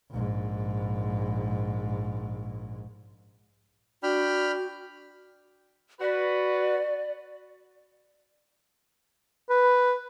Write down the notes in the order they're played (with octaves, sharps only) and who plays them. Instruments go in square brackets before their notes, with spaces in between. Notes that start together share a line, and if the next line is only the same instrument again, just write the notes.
[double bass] A#1 G#2
[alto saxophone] D4 [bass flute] F#4 [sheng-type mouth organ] G5 B5 F6
[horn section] F#4 B4 [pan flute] D5
[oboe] B4